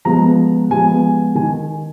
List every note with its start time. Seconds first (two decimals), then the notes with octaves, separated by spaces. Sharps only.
0.05 F3 G#3 B3 A#5
0.70 F3 G#3 B3 G#5
1.35 D#3 G#5